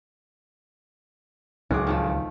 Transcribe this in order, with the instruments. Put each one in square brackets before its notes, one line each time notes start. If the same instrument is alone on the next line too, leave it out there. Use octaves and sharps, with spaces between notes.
[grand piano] D1 G#4 D6 [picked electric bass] C#2 [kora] F#4
[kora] D#3 F3 A3